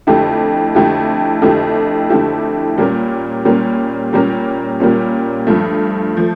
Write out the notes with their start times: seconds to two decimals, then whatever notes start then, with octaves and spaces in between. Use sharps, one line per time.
0.07 F2 D3 A3 E4 G4
0.75 F2 D3 A3 E4 G4
1.42 F2 D3 A3 E4 G4
2.10 F2 D3 A3 E4 G4
2.78 A#2 G3 A#3 C#4
3.45 A#2 G3 A#3 C#4
4.13 A#2 G3 A#3 C#4
4.80 A#2 G3 A#3 C#4
5.47 G2 F3 A3
6.17 F3 A3